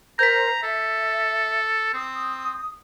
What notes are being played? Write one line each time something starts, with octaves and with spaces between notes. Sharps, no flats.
A#4 C5 A#5 G6 B6
A4 E5
C4 D#6